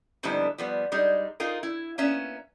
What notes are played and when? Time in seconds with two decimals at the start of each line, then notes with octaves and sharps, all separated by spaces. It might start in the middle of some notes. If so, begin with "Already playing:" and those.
0.23 F2 G#2 D3 G3 B3 E4
0.58 F3 G3 B3
0.92 G3 G#3 D#4
1.40 D#4 F4 G#4 A#4
1.63 E4
1.98 A#3 B3 C#4 E5